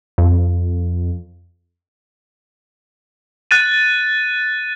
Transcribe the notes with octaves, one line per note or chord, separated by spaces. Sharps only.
F2
F#6 A6 D#7